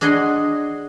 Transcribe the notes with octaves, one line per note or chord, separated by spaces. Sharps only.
D4 G#4 D#5 F#5 C6